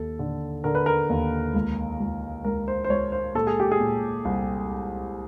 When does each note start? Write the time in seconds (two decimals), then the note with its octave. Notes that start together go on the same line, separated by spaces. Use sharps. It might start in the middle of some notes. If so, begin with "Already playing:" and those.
Already playing: D#2 A4
0.19 D3
0.64 D3 A#4
0.75 B4
0.86 A#4
1.10 D#2
1.54 C#2
2.00 C#2
2.44 C#2 A#4
2.68 C5
2.84 C5
2.90 C#2 C#5
3.12 C5
3.35 A#2 A4
3.47 G#4
3.60 G4
3.72 G#4
3.80 A#2
4.25 C2